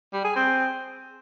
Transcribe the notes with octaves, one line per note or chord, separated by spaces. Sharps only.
G3
G#4
C4